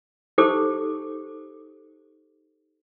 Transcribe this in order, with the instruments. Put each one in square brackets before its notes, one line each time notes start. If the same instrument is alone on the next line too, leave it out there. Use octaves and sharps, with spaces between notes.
[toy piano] D#4 G4 A4 C5 D6